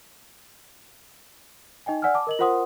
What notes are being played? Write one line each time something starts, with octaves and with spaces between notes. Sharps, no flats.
D#4 D#5 G5 G#5
D5 F#5 G#5 E6 F6
A5 D6
A#4 D#5 F#7
F4 A#4 C5 F#5 C6 D#6